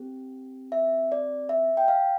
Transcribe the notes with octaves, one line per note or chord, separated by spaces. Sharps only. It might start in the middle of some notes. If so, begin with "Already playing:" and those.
Already playing: C4 G4
E5
D5
E5
G5
F5